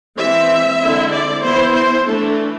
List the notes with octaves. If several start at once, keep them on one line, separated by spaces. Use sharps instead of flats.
E3 G#3 C4 E5
D3 G#3 C4 E4
D5
E3 B3 E4 C5
C5
E3 A3 D4 A4